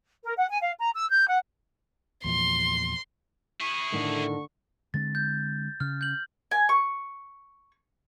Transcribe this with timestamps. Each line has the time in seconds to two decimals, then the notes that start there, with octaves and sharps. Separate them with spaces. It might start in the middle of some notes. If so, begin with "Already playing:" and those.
0.23 A#4
0.38 F#5
0.49 G#5
0.61 F5
0.79 A#5
0.94 E6
1.09 G6
1.28 F#5
2.24 E2 A#2 F3 C6
3.60 E4 G#4 C#6
3.92 A2 D3 D#3
4.94 D3 G#3 C4 A6
5.15 G6
5.80 C#3 F6
6.01 G6 F#7
6.51 G#5
6.69 C#6